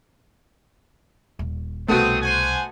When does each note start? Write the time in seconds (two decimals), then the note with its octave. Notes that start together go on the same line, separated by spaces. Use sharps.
1.39 D#1
1.88 C2 B2 A3 B3 C4 F#4 C5 D#6
2.22 C5 F#5 G#5